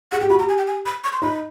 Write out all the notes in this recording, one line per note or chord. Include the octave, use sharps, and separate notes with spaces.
G#4 F#5
G4 G5
F#4 B5
G4 A#5
G#5
G5
G#5
B5
C#6
C6
D#4 B5